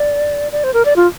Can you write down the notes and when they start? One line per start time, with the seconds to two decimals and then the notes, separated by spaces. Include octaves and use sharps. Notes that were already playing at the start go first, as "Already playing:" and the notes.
Already playing: D5
0.52 D5
0.64 C5
0.74 A#4
0.85 D5
0.96 F4